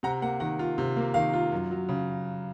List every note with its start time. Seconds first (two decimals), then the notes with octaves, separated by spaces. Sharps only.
0.03 C3 F#5 A#5
0.22 A#3 F#5
0.40 D#3 F#5
0.59 F4
0.78 C3
0.97 A#3
1.14 D#3 F5
1.33 F4
1.52 F#2
1.71 F#3
1.89 C#3